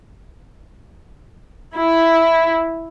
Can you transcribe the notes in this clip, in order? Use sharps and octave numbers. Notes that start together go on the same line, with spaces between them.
E4